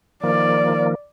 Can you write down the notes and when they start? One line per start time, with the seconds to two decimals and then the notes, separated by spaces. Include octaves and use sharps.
0.23 D#3 F3 A#3 D5